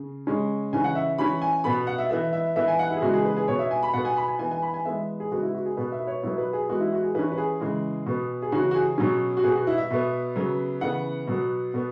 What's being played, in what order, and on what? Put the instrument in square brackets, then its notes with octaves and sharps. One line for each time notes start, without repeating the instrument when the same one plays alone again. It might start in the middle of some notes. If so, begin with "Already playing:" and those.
Already playing: [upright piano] C#3
C#3 G#3 C#4
C#3 E3 C#4 G#5
F#5
E5
E3 C#4 B5
G#5
B2 B3 B5
F#5
E5
E3 B3 E5
E5
E3 B3 E5
G#5
F#5
E4
G#4
C#3 E3 G#3 B3 F#4
G#4
B4
G#4
B2 B3 C#5
E5
G#5
B5
B2 B3 F#5
G#5
B5
G#5
E3 B3 G#5
G#5
B5
G#5
E3 G#3 B3 E5
G#4
C#3 G#3 B3 F#4
E4
F#4
G#4
B2 B3 B4
E5
B4
C#5
B2 F#3 B3 E4
B4
G#4
E3 G#3 B3 F#4
E4
F#4
G#4
E3 C#4 B4
B4
G#4
C#3 E3 G#3
B2 B3
G#4
C#3 E3 C#4 F#4
F#4
G#4
B2 F#3 C#4
F#4
B2 B3 G#4
F#4
E4
E5
B2 B3
C#3 F#3 B3
C#3 E3 B3 F#5
B2 F#3 B3
B2 B3